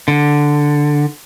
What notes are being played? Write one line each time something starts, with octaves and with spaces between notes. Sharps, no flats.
D3